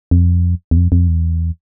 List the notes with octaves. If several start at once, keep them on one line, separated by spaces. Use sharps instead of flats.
F2
E2
F2
F2
E2